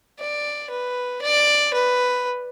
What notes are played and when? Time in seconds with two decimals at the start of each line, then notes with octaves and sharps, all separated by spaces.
0.19 D5
0.70 B4
1.22 D5
1.74 B4